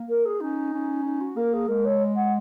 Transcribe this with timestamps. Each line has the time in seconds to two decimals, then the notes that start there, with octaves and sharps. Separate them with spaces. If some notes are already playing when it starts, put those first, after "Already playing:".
Already playing: A#3
0.09 A#4
0.25 G#4
0.40 C#4 D#4
0.73 C#4
1.05 D#4
1.21 F#4
1.36 A#3 A#4
1.53 G#4
1.68 G#3 A#4
1.85 C#5
2.16 F#5